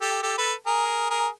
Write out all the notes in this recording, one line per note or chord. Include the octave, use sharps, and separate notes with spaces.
G4 A4
G4 A4
A4 B4
G#4 A#4
G#4 A#4